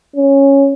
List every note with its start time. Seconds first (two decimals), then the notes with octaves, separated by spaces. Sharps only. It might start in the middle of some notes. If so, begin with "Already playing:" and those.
0.16 C#4